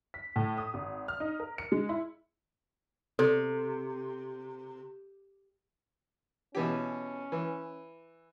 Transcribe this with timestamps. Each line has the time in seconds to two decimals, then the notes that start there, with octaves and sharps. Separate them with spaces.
0.14 B6
0.36 A2
0.58 D#6
0.74 G#1
1.08 F6
1.20 D#4
1.40 A#4
1.58 C#7
1.72 G#3
1.89 E4
3.19 C3 A4
6.55 B2 E3 C#4 G4
7.32 E3